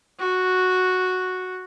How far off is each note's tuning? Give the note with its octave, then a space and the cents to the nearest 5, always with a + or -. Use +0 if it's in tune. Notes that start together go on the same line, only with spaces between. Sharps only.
F#4 -5